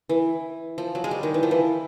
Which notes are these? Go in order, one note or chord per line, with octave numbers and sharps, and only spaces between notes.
E3
F3
F#3
G#3
G3
D#3
E3
F3
E3